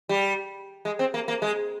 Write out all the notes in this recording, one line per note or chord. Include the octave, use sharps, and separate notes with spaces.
G3
G#3
C4
A#3
A#3
G#3